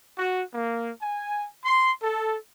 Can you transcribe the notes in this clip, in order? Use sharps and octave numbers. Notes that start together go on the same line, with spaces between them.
F#4
A#3
G#5
C6
A4